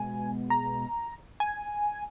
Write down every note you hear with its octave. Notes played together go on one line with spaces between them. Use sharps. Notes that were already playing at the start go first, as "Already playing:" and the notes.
Already playing: B2 G#3 B3 G#5
A#5
G#5